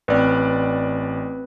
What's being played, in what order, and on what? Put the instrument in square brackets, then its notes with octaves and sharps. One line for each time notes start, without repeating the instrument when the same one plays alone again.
[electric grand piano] A1 D5 [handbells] C4 B4